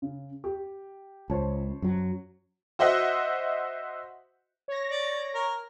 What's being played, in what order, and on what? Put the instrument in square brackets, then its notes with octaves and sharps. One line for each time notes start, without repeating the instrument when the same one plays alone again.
[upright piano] C#3
G4
[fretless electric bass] C#2 [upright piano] C5 C#5 A5
[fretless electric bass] F#2 F#3
[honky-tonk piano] F#4 C5 D#5 E5 F#5
[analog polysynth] C#5 A#6
[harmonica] D5
A#4